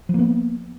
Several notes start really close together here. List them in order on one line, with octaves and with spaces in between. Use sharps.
F3 A#3 B3